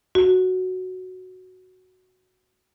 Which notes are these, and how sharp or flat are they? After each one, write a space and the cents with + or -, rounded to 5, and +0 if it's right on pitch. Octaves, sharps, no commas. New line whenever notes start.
F#4 +0